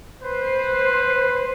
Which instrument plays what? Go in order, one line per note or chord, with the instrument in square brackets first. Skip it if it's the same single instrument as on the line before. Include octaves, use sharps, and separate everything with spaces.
[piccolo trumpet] B4 [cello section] C5